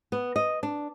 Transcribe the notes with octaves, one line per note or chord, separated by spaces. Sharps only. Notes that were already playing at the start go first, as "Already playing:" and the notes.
B3
D#5
D4